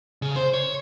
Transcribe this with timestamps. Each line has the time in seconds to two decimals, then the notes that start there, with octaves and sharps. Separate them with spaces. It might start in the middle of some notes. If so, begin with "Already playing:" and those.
0.22 C#3
0.36 C5
0.54 C#5